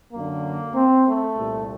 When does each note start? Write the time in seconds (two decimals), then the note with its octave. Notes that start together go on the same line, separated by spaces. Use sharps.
0.13 F#2 D3 A#3
0.75 C4
1.06 A3
1.36 C2 A#2